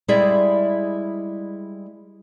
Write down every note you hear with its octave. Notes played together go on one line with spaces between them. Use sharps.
G3 G#3 E4 G#4 D5 E5